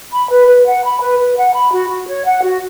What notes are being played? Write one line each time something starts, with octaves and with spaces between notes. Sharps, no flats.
B5
B4
B4
F#5
B5
B4
B4
F#5
B5
F#4
F#4
C#5
F#5
F#4